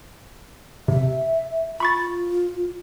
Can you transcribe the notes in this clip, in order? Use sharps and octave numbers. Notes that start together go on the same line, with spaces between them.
C3 E5
F4 B5 C#6 A6